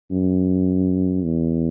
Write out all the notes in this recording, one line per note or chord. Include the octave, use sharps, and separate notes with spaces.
F#2
E2